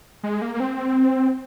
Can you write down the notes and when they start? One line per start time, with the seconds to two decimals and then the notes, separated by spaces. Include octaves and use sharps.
0.23 G#3
0.42 A#3
0.54 A#3
0.60 C4